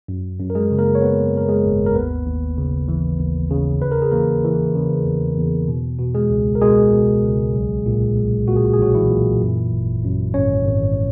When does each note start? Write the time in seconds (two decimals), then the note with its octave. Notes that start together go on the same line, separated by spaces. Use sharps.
0.08 F#2
0.39 F#2
0.50 A#4
0.55 G#3 G#4
0.71 C#3
0.78 A#3 A#4
0.95 C#5
1.02 F#2 B3 B4
1.33 F#2 A#4
1.49 G#3 G#4
1.64 G#1
1.86 A#4
1.95 D#2 B3 B4
2.26 D#2
2.57 C#3
2.88 E3
3.19 D#2
3.51 C#3
3.82 E2 B4
3.92 A#4
4.02 G#4
4.11 E3 A#3 A#4
4.44 E3
4.75 C#3
5.06 E2
5.38 E2
5.68 B2
5.99 B2
6.15 G#3 G#4
6.30 C#2
6.55 A#4
6.61 B2 G#3 G#4
6.93 B2
7.24 C#2
7.55 B1
7.86 A#2
8.17 B1
8.48 A#2 F#4
8.56 G#4
8.65 F#4
8.73 G#4
8.79 B1 F#3 F#4
8.95 E3 E4
9.10 A#2
9.41 F#2
9.72 G#1
10.04 F#2
10.34 G#1 C#4 C#5
10.65 G#1